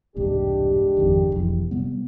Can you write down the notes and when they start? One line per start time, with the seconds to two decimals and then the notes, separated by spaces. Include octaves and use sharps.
0.16 E1 C2 G#2 G#3 D4 G4
0.97 G#1 F2 D#3
1.32 F1 B1 E3
1.71 C3 G3 B3